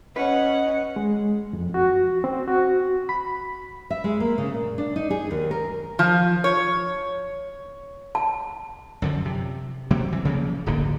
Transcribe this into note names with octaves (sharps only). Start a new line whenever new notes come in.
C#4 B4 C#5 D#5 F#5
G#3
F2
F#4
C4
F#4
B5
E5
G#3
A#3
C#3
A#2
D4
D#4
G#4
D#2
A#4
F3
C#5
A5
F#2 D3 F3
C3
C3 F#3 G3 A#3
E3
C#3 F3 A3 A#3
D1 G1 D3 A#3